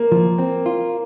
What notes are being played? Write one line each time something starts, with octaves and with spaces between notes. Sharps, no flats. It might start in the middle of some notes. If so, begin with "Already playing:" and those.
Already playing: A#3
F3
C4
F4